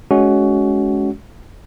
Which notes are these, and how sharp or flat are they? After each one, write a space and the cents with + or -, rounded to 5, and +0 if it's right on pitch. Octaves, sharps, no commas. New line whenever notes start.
G#3 +25 C#4 +20 F#4 +15